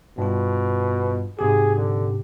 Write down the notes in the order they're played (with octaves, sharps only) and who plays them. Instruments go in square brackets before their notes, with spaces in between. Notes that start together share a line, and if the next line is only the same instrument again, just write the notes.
[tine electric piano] G2 F4 [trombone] B2
[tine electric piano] G#2 C3 G4 [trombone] G#4
[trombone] D3